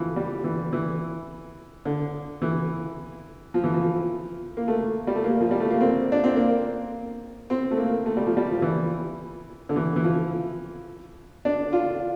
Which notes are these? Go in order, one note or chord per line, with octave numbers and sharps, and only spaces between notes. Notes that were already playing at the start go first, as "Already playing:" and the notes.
Already playing: E3 F3
G3
E3
E3
D3
E3
F3
E3
F3
A#3
A3
G3
A3
A#3
F3
G3
A3
A#3
C4
D4
C4
A#3
C4
A3
A#3
A3
G3
F3
G3
F3
E3
D3
E3
E3
F3
D4
F4